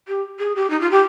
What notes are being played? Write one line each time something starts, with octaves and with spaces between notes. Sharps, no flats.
G4
G#4
G4
D#4
F4
G4